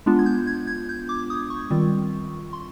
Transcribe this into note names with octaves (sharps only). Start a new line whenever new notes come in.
G#3 B3 D4 F4
G#6
G6
G#6
G#6
G6
D6
D#6
C#6
D#3 G3 C4 F4
C6